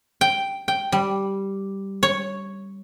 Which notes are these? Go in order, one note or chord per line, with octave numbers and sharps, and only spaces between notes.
G5
G5
G3
C#5